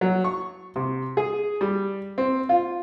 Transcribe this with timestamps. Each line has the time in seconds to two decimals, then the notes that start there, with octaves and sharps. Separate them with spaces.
0.01 F#3
0.24 C#6
0.76 C3
1.17 G#4
1.61 G3
2.18 C4
2.49 F4